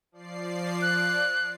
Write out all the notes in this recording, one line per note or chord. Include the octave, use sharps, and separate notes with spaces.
F3 D5 C7
F#6